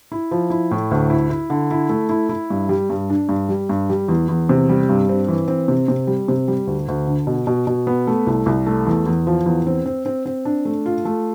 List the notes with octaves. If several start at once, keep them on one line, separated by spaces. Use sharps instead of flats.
E4
F3
E4
A2
D2
E4
E4
D3
E4
A3
E4
E4
G2
G3
G2
D4
G2
G3
G2
G3
E2
E2
C3
G3
G2
C4
E3
C4
C3
C3
G3
C3
G3
D2
D2
D3
B2
B2
B2
B3
A3
C2
C2
A3
E2
E2
F3
E2
C4
C4
C4
C4
D4
A3
F4
A3